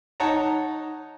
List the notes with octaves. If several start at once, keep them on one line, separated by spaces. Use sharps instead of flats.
D#4 C#5 F#5 A5 A#5